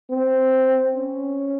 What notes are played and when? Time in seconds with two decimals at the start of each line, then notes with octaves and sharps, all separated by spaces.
0.11 C4
0.96 C#4